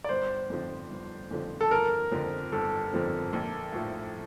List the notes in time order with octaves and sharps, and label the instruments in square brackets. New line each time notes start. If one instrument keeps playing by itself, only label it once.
[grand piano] D5
[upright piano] G1 [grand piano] C5
[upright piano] F2 D3 F3 C4
G1
F2 D3 F3 C4
[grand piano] A4
[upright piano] G1 [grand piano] A#4
[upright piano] F2 D3 F3 C4
[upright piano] G1 [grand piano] A4
[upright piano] F2 D3 F3 C4
A#1
A2 F3